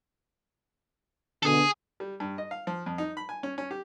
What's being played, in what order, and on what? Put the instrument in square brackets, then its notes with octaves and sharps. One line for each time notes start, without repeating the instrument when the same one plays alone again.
[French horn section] B2 D3 [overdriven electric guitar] G#4 A4
[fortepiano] G3
G2
D#5
F5
F3
F2
D#4
B5
G#5
C#4
C#4
G4